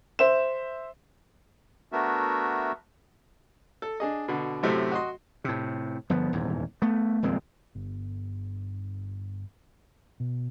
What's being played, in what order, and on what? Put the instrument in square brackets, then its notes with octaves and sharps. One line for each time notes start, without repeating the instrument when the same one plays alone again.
[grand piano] C5 E5 E7
[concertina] A3 B3 D4 F#4 A#4 E5
[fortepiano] A4
D4 G#4 D#5
B2 D3
F#2 A2 C3 A3
F#4 D#5 C6
[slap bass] A2 C3
G1 F3 B3
D#1 E2 G#2
A3 B3
D#1 F2 G#3 C4
[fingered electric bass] G1
B2